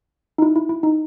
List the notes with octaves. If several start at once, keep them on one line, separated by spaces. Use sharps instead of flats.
D#4
E4
E4
E4
D#4